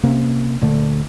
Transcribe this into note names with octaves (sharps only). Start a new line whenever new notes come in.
C3 A#3 C#4
D2 A#2 D3 A3